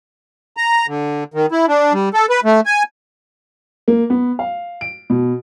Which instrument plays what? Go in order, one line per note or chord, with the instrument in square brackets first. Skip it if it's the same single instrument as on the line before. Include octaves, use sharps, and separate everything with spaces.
[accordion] A#5
D3
D#3
E4
D4
G3
A4
B4
A3
G#5
[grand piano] A#3
B3
F5
D7
B2